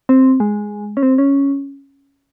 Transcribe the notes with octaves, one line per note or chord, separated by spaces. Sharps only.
C4
G#3
C#4
C4
C#4